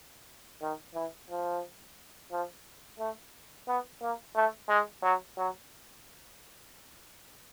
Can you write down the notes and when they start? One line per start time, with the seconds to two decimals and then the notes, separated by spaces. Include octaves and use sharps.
0.62 D#3
0.95 E3
1.30 F3
2.32 F3
2.99 A3
3.68 B3
4.01 A#3
4.35 A3
4.69 G#3
5.03 F#3
5.38 F#3